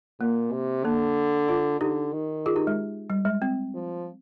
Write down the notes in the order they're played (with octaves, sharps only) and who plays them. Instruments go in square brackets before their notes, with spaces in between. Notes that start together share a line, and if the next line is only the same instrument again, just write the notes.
[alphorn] A#2 [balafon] A#3
[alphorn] C3
[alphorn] D3 [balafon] A#3 D4
[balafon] D4 F4
[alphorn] D3 [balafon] D#4 G4
[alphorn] D#3
[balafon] F4 G#4
D#4 G4
G#3
G3
G#3
C4
[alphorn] F3